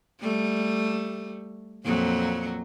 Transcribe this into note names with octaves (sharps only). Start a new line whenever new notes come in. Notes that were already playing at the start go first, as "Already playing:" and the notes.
G3 A3
F2 A#2 F#3